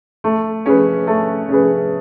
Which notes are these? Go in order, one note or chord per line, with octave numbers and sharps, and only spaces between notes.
A3
C#4 G#4 B4
A3
C#4 G#4 B4